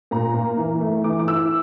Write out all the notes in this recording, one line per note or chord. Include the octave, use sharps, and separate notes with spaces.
A#2 A#5
A#3
E3
A3
E3 D6
D6
E4 E6